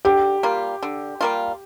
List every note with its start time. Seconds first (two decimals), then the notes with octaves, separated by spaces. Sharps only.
0.05 D3 G4
0.43 G3 A#3 F4
0.83 D3
1.21 G3 A#3 F4